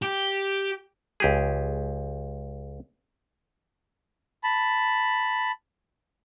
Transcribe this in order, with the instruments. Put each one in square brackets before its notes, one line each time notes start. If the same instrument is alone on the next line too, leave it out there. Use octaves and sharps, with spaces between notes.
[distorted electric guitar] G4
[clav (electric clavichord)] C#2 G4 G#4
[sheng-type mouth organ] A5 B5